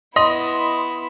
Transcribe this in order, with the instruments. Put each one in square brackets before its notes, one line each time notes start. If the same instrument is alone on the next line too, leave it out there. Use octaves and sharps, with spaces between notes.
[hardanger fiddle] B3 E4 [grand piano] D#5 [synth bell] C6